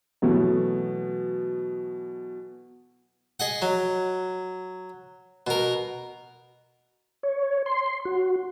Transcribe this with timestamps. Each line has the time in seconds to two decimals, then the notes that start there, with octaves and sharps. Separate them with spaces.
0.22 B2 E3 F#3 A3 B3
3.40 G#4 D#5 F#5
3.62 F#3
5.47 B2 A#4
7.23 C#5
7.66 C6
8.05 F#4